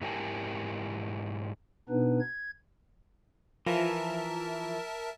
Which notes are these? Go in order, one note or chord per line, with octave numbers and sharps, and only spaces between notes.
G#2 E4 G4 A#4 G#5 A5
B2 B3 D4 D#4 B4
G#6
E3 F3 A#4 E5 A5 A#5